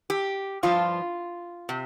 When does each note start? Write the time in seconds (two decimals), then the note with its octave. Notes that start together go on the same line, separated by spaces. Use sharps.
0.10 G4
0.63 G2 F3 F4
1.69 C3